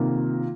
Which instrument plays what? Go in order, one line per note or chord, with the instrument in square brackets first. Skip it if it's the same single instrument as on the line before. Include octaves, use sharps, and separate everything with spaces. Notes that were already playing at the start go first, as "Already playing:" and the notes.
Already playing: [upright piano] C3 D#3 A#3 F4